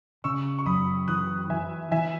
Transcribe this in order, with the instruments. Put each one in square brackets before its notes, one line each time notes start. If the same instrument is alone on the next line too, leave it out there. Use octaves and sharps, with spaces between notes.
[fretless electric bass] C#3 [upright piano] C#6 E6
[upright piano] C#6
[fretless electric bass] F#2 [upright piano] B5 D#6
[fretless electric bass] E3 [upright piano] D#6 F#6
[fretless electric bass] E3 [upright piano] E5 G#5
[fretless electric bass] E3 [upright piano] E5 G#5